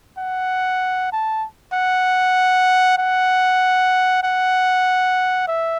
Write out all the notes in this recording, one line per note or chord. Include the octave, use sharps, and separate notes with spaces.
F#5
A5
F#5
F#5
F#5
E5